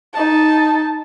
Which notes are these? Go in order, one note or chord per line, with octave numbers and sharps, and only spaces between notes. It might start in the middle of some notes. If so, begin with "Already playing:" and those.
D#4 A5